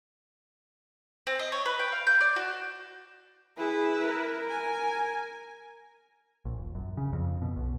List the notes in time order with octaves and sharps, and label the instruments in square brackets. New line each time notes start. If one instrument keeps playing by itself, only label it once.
[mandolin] C4
D#5
C#5
B4
G5
F5
G6
D5
F#4
[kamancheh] E4 B4 [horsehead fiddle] G#4
[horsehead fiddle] A#4
[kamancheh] G#5
[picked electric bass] A#1
D#1
F#2
C#3
F2
B2
B1